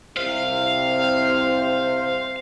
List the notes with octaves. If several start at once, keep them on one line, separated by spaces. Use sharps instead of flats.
C2 C3 C5 F5